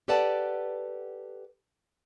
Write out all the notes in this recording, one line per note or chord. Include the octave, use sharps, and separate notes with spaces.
G4 A4 B4 D5 F#5 A5